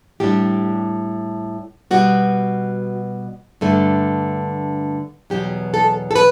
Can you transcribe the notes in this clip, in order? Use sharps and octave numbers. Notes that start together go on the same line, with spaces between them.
A2 G3 D4 G4
B2 G3 B3 F#4
G2 D3 A3
E2 B2 F#3 G4
A4
A4
B4